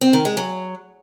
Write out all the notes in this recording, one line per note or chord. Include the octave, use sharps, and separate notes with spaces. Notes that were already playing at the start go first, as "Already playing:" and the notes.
C4
D#3
G#3
F#3